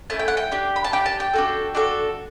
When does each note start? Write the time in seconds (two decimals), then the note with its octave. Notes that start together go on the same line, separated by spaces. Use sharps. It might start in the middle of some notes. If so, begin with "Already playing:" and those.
0.10 A3 C#4 E4 A5
0.19 G5
0.28 F#5
0.37 G5
0.52 D4 G4
0.76 B5
0.84 A5
0.93 D4 G4 G5
1.06 A5
1.20 G5
1.34 D4 F#4 A4
1.75 D4 F#4 A4